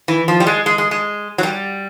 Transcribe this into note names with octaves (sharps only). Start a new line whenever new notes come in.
E3
F3
G3
G#3
G#3
G#3
G#3
F#3
G3